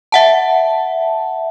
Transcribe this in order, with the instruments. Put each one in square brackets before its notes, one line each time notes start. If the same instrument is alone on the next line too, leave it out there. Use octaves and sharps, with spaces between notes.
[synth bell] E5 F#5 A5